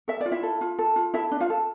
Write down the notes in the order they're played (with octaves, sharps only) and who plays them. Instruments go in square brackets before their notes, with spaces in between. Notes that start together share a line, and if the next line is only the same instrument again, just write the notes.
[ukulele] A4 E5
F4 D5
E4 E5
A4
F4
A4
F4
E4 A4 E5
D4
F4 F5
A4